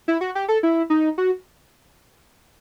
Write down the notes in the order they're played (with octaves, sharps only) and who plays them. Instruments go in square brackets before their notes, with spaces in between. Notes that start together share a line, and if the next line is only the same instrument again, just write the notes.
[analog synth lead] E4
F#4
G4
A4
E4
D#4
F#4